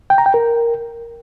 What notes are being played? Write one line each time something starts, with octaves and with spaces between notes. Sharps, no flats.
G5
A#5
G5
A#4